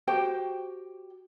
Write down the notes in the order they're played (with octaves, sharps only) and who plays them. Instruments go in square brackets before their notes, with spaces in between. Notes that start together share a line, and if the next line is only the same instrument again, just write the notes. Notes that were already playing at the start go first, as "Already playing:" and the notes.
[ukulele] F#4 G4 C5 G5